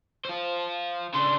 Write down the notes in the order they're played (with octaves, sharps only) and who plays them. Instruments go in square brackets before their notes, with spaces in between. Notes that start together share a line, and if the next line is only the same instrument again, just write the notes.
[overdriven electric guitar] F4 C5
[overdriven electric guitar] C#3 D4 [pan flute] C6